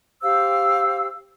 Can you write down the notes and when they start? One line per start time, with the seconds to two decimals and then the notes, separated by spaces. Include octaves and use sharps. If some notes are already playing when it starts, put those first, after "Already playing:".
0.22 G4 C5 F5 E6